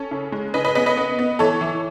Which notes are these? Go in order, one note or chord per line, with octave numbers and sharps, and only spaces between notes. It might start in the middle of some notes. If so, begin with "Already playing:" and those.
Already playing: C#4 A4 C#5
C#3
G#3
C#3 B4 D#5
B4 D#5
B3 B4 D#5
B4 D#5
B3
B3
E3 A4 C#5
E3